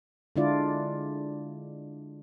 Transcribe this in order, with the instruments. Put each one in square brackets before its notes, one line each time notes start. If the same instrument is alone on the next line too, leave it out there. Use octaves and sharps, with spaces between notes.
[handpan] D3 G#3 D4 E4 F4 D5